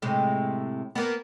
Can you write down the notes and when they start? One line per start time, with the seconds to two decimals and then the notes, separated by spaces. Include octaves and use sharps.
0.02 A2 C3 G#3
0.95 A#3 B3